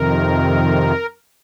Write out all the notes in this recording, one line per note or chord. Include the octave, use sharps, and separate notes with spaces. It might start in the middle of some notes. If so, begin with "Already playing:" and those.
Already playing: F2 C3 D#3 A#4